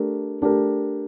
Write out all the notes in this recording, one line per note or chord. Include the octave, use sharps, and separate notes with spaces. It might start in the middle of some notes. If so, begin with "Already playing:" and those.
Already playing: A3 D4 G4 A#4
A3 D4 G4 A#4